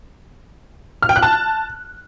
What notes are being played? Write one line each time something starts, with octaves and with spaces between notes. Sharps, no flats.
F6
G5
F#6
A5